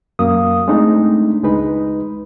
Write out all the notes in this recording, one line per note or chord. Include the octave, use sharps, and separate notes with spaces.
F#2 A#3 F5 D#6
G#3 A3 C4 D4 D#4
C#2 G#3 D#4 B4